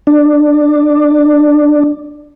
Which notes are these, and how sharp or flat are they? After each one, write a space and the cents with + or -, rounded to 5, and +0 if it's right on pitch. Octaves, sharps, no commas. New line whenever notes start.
D4 +15